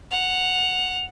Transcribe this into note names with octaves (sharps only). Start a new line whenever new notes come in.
F#5 F7